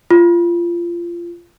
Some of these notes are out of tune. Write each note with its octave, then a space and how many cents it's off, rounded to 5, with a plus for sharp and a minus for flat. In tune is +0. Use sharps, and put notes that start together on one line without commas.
F4 -20